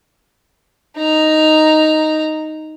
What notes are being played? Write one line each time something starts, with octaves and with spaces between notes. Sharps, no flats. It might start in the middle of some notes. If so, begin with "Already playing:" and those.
D#4 A#5